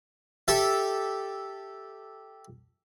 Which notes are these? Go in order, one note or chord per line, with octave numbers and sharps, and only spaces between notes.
G4 A4 E5